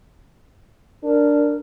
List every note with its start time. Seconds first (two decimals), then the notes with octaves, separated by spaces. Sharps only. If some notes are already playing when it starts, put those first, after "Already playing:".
1.03 D4 A#4